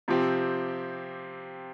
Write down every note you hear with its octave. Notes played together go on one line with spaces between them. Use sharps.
C3 F3 C4 G4